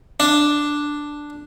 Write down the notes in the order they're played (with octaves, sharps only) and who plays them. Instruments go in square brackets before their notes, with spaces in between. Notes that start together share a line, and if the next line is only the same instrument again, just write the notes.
[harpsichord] D4